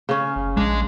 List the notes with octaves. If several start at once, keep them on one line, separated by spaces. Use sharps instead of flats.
C#3 C#4
F#1
A#1 G#3 D4